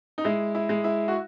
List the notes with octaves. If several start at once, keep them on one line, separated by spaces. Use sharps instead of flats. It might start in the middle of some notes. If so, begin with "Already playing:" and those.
D#4
G#3 E4
E4
G#3
E4
F#4